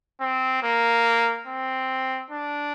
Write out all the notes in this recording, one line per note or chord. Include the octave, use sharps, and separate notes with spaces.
C4
A#3
C4
D4